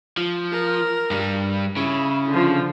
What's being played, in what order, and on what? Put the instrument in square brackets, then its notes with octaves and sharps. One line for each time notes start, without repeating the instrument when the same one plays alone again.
[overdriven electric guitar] F3
[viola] A#4
[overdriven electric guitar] G2 G3
[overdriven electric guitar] C#3 [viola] E4
[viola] D3 F3